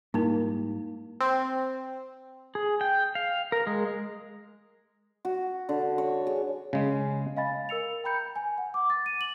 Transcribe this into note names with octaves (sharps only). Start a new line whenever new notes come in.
G#2 G3 A#3 D#4 E4
C4
G#4
G5
F5
A#4
G#3
F#4
D3
C#5
G#4
C#3 G#3
D#5 F5 G#5 B5 A6
A#4 E6 C#7 F7
G5 A#5 B5 G6 C#7
G#5
F#5
D6
A6
D#7
F#7